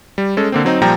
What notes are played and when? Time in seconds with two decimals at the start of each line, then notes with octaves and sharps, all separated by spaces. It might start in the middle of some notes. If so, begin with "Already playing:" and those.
0.18 G3
0.37 G#3 C#4 A4
0.52 D3 A#3 C4
0.65 F#3 C4 D#4
0.82 A#2 F3 G3 G5 A#5